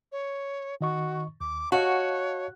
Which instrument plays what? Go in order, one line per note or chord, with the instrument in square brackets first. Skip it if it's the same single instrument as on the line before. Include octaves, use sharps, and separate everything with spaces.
[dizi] C#5
[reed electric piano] D#3 D#5 C#6 [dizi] F#4
[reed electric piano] D#2 [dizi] D6
[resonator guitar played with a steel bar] F#4 [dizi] C#5 [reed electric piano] D#5 F5 A5